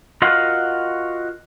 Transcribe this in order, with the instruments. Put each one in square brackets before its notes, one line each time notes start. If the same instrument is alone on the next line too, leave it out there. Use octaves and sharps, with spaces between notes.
[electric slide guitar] F4 F#4 A#4 D#5 F5 F#5